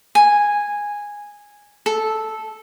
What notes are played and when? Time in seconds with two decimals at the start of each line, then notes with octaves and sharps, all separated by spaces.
0.15 G#5
1.86 A4